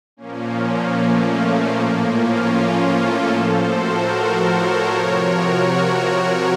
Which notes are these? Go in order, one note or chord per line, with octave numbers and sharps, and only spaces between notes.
A#2 F3 A#3 C#4
A#3
A3
A3
A2 F3 A#3
C#4 F4
F4 A4
A2 F3 A4 C5
F#4 A#4
A#4 C#5
C3 F3
F#4 A#4